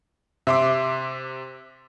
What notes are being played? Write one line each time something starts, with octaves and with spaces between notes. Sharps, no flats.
C3 E5 C6 D6